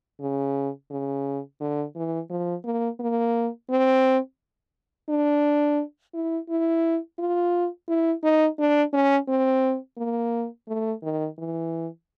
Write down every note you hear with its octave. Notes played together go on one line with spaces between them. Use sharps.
C#3
C#3
D3
E3
F3
A#3
A#3
C4
D4
E4
E4
F4
E4
D#4
D4
C#4
C4
A#3
A3
D#3
E3